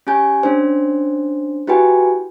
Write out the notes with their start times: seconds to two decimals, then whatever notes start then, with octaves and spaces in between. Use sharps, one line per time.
0.07 C#4 G4 G#5 G6
0.43 C#4 D4 C5
1.67 E4 F#4 G4 B4 G5 G#5